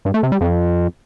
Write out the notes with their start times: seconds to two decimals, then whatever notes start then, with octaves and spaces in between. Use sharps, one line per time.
0.05 G2
0.14 A3
0.23 C3
0.32 G3
0.41 F2